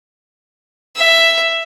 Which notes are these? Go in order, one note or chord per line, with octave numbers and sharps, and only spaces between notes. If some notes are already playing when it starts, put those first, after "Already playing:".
E5